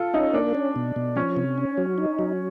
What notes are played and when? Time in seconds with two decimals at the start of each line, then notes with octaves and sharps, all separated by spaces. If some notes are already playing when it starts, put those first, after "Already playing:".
Already playing: F4 A4
0.13 C#4 D#4
0.33 A#3 D4
0.55 C#4
0.76 B2
0.96 B2
1.16 F3 C#4
1.37 C3
1.58 C#4
1.78 F#3
1.98 D#4
2.19 F#3